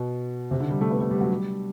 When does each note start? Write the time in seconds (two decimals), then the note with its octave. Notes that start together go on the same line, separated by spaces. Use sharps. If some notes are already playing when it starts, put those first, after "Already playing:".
Already playing: B2
0.51 C3
0.60 D3
0.71 G3
0.81 A3
0.91 B3
1.01 A3
1.11 G3
1.21 F#3
1.31 G3